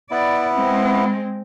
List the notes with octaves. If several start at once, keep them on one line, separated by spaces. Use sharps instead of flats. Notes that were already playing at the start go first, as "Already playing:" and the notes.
B3 E4 D5
G#3 C4